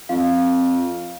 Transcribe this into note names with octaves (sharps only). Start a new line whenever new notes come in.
F2 F5